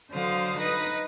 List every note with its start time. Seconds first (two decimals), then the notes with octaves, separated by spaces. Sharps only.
0.12 D3 F#3 C5 F5 D#6
0.58 D#4 B4 D#6 A#6